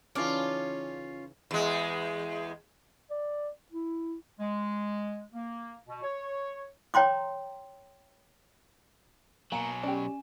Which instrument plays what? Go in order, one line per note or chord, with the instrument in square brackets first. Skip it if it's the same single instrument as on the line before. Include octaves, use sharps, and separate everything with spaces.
[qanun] C#3 E3 D#4 [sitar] C#4 F4 [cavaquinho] D5 F5 A5
[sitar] E2 G#3
[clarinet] D5
E4
[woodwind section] G#3
A#3
B2
C#5
[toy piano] C#5 G5 A#5 C6 D6
[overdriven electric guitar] B2 F#3 [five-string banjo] A#3 [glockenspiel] G#5 E7
[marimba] C#4 [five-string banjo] G4 D5